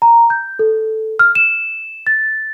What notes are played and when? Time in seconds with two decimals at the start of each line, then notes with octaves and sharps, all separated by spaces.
0.02 A#5
0.30 G6
0.59 A4
1.19 F6
1.35 E7
2.07 A6